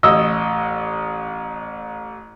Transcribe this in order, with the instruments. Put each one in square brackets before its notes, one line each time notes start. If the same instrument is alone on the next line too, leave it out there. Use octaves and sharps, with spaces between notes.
[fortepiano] A1 D#5 E6